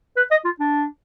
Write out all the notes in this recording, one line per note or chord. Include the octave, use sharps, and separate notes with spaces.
B4
D#5
F4
D4